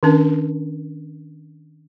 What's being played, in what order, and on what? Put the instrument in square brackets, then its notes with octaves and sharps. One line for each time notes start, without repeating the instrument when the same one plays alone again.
[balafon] D#3 C#4 D4 A#4